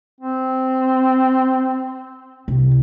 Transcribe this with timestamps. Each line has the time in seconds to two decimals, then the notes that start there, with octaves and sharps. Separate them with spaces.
0.21 C4
2.48 C2